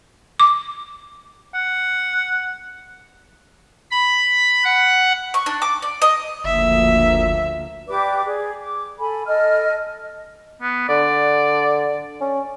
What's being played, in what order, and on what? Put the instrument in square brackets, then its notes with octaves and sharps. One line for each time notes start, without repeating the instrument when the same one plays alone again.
[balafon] D6
[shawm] F#5
[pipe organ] B5
F#5
[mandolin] C#6
D4
D6
D5
D#5
[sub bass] F#1 [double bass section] D2 F3 A#3 [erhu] E5
[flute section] G4 B4 D5 D6
G#4
D6
A4 G#5 B5
A4 D#5 F6
[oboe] B3
[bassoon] D3 [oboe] D5
[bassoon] C#4